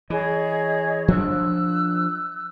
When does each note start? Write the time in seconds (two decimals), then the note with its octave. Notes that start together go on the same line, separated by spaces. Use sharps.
0.10 E3 G#4 C#5 D#5
1.08 F3 D4 E6 F#6